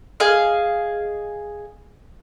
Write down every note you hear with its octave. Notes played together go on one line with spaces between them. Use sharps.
G#4 D#5 F5